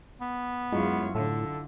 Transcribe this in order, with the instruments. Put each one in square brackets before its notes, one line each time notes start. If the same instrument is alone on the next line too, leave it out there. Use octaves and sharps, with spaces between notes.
[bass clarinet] B3
[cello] F#2 C#5 [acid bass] G#3 [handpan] E4 F4
[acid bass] A2 [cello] D3 [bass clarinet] A4